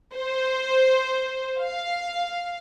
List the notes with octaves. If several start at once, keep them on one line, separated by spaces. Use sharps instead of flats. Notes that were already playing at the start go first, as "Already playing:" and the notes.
C5
F5